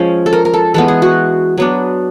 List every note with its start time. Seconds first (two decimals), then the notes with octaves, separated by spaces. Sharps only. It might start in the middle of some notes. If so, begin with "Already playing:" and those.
Already playing: F3 G#3 C#4
0.26 A4
0.33 A#4
0.45 A#4
0.54 A4
0.74 E3 G#3 B3 A4
0.88 G#4
1.02 F#4
1.58 F#3 B3 D4